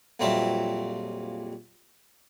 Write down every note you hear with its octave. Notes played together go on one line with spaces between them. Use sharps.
A#1 F2 F#3 G3 C4 E5